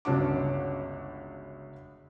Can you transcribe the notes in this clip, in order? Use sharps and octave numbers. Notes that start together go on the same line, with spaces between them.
G1 C#2 C#4 D4 F#4 D6